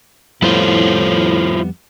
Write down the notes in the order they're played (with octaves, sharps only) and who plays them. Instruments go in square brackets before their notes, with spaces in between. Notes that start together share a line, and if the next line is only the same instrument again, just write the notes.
[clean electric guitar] F2 G3 B3 [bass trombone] A2 [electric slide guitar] E4 F4 C5